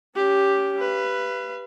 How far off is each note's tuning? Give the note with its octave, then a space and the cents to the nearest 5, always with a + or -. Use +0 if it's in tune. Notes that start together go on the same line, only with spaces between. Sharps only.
C#4 +25 G4 +0
B4 +0 F5 -45